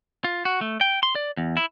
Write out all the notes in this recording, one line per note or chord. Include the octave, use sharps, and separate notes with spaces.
F4
F#4
A3
G5
C6
D5
E2
E4